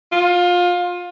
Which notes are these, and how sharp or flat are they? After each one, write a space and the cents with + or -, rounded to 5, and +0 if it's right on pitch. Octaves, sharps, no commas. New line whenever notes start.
F4 +25